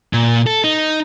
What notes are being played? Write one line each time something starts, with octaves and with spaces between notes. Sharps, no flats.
A#2
A4
D#4